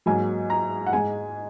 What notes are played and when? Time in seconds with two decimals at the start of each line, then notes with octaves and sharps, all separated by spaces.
0.06 G#2 F#3 A#3 G#5
0.50 A#5
0.86 F#5
0.93 G#2 G#3 G#5